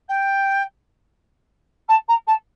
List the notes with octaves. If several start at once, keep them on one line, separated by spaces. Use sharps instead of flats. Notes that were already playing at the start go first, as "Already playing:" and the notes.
G5
A5
A#5
A5